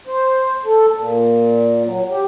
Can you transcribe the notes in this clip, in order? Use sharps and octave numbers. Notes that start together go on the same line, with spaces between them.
C5
A4
A#2
F#3
G4